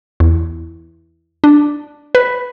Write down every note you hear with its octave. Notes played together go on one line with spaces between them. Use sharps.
E2
D4
B4